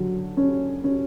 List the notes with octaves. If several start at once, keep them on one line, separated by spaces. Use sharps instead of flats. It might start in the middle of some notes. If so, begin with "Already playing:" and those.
Already playing: D3 F#3
C#4
C#4